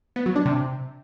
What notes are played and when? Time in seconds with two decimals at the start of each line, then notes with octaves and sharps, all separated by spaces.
0.16 B3
0.26 F#3
0.36 D4
0.45 C3